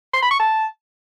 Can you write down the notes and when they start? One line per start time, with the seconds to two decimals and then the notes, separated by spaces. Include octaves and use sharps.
0.14 C6
0.22 B5
0.31 C#6
0.40 A5